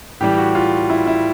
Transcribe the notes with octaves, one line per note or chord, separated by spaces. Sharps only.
A2 E3 G3 G4
F#4
F4
E4
E4